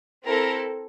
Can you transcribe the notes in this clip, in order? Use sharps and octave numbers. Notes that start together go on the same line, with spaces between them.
C4 E4 A4 A#4